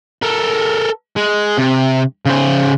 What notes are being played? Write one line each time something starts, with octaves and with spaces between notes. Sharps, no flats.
A4 A#4
G#3
C3
C#3 C5